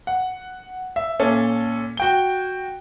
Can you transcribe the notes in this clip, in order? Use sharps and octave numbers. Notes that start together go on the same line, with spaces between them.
F#5
E5
A#2 C#4 A4
F#4 G5 G7